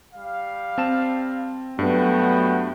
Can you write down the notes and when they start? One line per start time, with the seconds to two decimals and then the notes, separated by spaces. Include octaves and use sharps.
0.14 G3 F5
0.78 C4 A5 E7
1.79 G2 F#3 A3 B3 F#4 G5